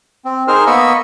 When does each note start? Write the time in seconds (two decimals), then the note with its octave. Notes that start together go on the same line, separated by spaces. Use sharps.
0.25 C4
0.48 D#4 G#4 A#4 C5 F6
0.67 A#3 B3 D#5 B5 C#6 E6